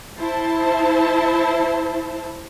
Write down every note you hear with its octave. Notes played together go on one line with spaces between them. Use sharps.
E4 C5 A5